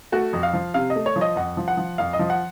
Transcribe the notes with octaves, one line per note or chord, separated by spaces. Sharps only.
A3 F#4
F2
F5
F3
C3 F5
D#5
A3
C#5
F3
D#5
F2 F#5
F3
F#5
F3
F2 F5
D#5
F3
F#5